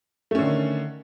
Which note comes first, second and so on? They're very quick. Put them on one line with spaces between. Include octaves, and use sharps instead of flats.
A3 C#4 D3 D#3